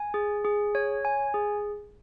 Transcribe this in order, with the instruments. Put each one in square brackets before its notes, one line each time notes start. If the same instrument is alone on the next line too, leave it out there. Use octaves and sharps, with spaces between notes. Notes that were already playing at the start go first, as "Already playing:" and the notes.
Already playing: [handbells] G#5
G#4
G#4
C#5
G#5
G#4